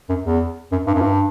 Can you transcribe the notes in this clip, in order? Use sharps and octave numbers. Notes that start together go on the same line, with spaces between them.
F#2
E2
F#2
G2
F#2
G2